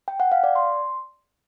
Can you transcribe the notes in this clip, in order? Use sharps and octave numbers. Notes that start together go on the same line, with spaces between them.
G5
F#5
F5
D5
C6